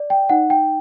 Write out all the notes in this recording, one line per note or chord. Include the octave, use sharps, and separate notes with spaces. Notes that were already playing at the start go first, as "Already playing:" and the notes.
Already playing: D5
G5
D#4 F#5
G5